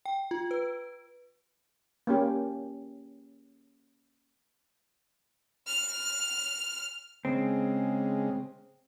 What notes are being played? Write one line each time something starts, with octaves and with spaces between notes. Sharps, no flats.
G5
F4
B4
A#3 C#4 G4
F6
C#3 G#3 C4